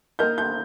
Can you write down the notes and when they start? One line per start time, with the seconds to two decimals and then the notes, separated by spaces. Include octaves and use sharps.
0.19 A#3 D#4 A#4 D#5 G6
0.38 G6